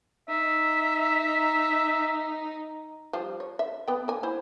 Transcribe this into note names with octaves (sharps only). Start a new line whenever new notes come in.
D#4 E5
F3 G3 F5
C#5
E5
B3 G5
A#3 G#5
E4 C5